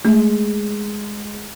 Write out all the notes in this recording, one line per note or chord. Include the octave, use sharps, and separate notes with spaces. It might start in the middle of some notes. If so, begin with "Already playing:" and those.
G#3 A3